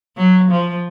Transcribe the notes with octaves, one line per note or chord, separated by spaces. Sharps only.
F#3
F3